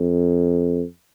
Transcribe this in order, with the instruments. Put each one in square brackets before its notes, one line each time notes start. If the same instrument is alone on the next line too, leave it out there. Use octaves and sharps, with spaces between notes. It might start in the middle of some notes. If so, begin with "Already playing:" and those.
Already playing: [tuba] F2